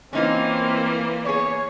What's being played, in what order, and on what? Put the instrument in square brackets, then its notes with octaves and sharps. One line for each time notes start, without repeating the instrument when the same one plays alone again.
[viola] E3 A#3 [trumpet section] C4 [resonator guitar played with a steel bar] C#4 D#4 F4
[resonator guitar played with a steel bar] B3 G#4 [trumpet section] C#5